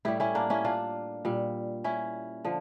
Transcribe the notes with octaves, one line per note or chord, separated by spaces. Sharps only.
A2 G3 E4 G4
C#4 E4
A#3 D4
C#4 E4
D4 F4
A#2 G3
C#4 E4
D3 F3